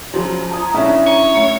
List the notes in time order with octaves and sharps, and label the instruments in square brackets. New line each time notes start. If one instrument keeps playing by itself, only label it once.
[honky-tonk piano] C#3 F#3 [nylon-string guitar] F3
[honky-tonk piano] A5 D#6 G#6 [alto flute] A#5
[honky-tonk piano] B1 [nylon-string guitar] C#4 D4 E4 [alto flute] E5
[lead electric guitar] C#5 [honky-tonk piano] A#5 D#7
[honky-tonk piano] A2